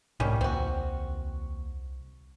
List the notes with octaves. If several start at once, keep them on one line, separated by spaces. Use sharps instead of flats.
C2 A2 D#3 G3 C#4
D#2 C4 F#4